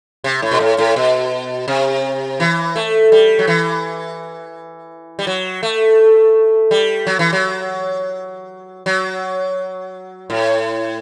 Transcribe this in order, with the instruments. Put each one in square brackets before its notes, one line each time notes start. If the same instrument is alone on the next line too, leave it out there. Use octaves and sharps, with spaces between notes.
[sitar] C3
A2
B2
A2
A2
B2
C3
E3
A3
G3
F#3
E3
G3
F#3
A3
G3
F#3
E3
F#3
F#3
A2